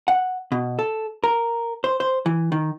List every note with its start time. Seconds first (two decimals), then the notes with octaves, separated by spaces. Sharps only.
0.08 F#5
0.52 B2
0.79 A4
1.24 A#4
1.84 C5
2.00 C5
2.26 E3
2.52 D#3